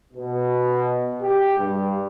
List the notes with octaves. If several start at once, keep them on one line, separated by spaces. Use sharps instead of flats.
B2
G4
G2